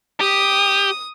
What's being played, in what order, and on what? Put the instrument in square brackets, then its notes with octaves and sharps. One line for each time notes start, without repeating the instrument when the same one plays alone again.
[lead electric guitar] G4 [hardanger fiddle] D#6